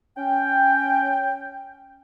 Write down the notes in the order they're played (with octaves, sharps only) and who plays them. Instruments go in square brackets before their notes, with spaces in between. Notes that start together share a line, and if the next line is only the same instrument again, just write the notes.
[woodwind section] C#4 G5